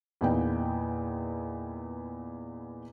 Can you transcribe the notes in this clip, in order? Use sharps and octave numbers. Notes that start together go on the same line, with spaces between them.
E2 A#2 B3 D#4 G5